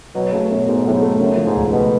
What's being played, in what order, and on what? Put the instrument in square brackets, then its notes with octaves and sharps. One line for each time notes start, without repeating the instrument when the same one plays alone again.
[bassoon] B2 [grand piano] F#3
[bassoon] C#3 [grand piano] A3
[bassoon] F#2 [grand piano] B2
[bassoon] G#2 [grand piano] B2
[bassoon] A2 [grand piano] F#3
[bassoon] G#2
[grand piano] A3
[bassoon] F#2 [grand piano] C#3
[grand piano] F3
[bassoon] G#2
[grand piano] C#2
[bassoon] B2 [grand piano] A3